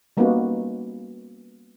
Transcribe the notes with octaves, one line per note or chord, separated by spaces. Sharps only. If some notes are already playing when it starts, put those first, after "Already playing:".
G3 A#3 B3 C#4 D#4 F#4